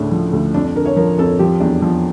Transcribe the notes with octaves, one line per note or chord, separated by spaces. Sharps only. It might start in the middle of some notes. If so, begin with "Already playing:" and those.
Already playing: D2 A2 C#3 C#4 D4
F3
D2
F2 D4
D4
D3 A#4
C#5
F3 A#4
F2 A4
F3 G4
E2 D4
F3